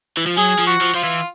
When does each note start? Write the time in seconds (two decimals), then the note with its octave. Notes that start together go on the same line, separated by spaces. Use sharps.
0.17 E3
0.26 F3
0.37 F#3 G#4
0.59 F3
0.67 F#4
0.81 F3
0.94 F3 F4
1.04 E3